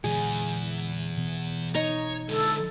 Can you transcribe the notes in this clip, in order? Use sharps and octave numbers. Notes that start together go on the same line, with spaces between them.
E2 A#2 D3 G#3 G#4
B2 E3 B3
D#4 C#5 A#5
D3 G#3 A4